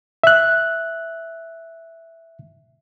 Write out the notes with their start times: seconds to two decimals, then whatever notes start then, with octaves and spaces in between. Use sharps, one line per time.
0.24 E5 F#6